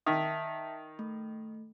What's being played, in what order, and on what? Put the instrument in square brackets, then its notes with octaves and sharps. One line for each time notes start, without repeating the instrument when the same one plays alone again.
[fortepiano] D#3 [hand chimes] E5 A5 B6
[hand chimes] A3